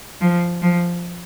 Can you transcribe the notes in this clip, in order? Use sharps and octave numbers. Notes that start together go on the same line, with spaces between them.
F3
F3